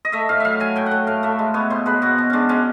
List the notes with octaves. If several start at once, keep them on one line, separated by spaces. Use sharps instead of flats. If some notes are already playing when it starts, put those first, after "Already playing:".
D#5
A3 E5
A2 F5
F#3 E5 F5
F#3 G#5
A2 G5
F#5
A3 G5
A2 F5
A3 E5
G#3
B3 C#5
B2 C5
G#3 B4
B2 F#4
B2
G#3 C#4 D4
G#3 C#4